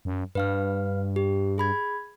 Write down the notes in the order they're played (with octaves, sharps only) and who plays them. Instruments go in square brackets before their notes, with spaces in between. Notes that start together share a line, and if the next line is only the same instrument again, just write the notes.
[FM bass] F#2
[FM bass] G2 [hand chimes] B4 F5 F6
[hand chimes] G4
G#4 B5 G#6